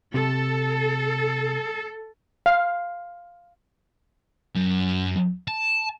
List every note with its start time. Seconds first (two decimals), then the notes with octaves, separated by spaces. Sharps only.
0.14 C3 A4
2.46 F5
4.55 F#2
5.48 A5